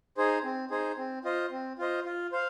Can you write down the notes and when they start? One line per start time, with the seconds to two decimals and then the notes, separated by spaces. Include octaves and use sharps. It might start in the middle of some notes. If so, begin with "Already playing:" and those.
0.17 D#4 G#4 C5
0.44 C4
0.70 D#4 G#4 C5
0.97 C4
1.24 F4 C5 D#5
1.51 C4
1.78 F4 C5 D#5
2.05 F4
2.32 C5 F5